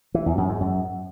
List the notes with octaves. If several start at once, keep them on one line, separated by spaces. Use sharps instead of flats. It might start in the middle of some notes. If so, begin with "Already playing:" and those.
E3
E2
F#2
G#2
F#2